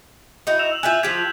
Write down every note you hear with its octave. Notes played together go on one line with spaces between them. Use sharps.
D#4 E4 F#4
E6 E7 F7
E6 F7 F#7
F4 E5 G#5 F#6 G6 E7
F3 F4 G4 G#6 B6